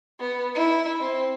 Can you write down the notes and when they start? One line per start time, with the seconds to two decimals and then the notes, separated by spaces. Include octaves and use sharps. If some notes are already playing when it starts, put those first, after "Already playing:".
0.20 B3
0.55 E4
1.00 C4